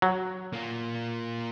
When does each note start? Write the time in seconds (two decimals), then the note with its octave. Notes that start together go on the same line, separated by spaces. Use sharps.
0.02 F#3
0.53 A#3 F4